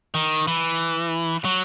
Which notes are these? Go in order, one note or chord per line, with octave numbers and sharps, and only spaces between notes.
D#3
E3
F#3